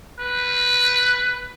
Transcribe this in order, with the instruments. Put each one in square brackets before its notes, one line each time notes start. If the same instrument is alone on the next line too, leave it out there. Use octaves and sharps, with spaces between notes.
[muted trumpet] B4